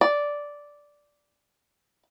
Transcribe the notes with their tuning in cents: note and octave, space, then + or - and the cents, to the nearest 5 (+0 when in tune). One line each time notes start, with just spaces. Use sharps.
D5 -5